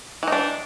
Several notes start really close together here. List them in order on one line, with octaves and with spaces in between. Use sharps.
E3 D#4 D4